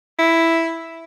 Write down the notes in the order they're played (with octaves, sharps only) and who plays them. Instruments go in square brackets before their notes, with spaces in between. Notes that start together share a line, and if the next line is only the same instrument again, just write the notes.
[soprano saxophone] E4